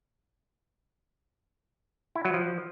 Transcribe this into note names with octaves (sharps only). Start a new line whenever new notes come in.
E4
F#3
F3